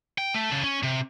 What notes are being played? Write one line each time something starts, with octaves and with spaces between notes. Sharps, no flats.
G5
A3
C#3 A4
C#4
C3